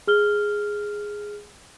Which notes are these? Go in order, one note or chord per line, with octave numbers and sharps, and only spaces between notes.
G#4 F6 G7